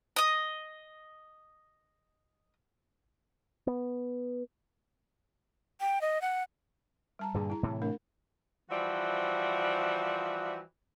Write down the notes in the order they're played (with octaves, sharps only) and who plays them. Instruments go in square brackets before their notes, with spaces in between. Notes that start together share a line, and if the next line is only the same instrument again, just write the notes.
[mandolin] D#5 D#6
[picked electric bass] B3
[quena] G5
D#5
F#5
[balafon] G3 A5 A#5
[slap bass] G2 A#2 D3 [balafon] G#4
[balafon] E4 A#5
[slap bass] A2 C3 E3
[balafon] A3 D4 A#4
[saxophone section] E3 F3 G3 F#4 C5 E5